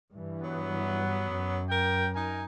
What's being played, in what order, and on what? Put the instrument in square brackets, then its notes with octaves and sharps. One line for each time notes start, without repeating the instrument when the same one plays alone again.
[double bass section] G2 E3
[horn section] F#3 B3
[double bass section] F#2
[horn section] A#4 G5
D#4 A#4 G#5